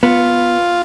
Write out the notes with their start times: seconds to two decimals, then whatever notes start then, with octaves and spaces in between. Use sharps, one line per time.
0.03 B3 F4